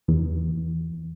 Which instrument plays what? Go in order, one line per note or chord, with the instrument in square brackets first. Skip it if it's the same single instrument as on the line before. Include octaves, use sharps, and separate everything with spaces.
[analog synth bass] E2